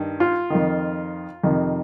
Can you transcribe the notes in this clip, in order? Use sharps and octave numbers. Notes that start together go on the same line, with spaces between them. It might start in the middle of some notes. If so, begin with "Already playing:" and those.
Already playing: G2 D#3
F4
F2 D#3
F2 C3 D#3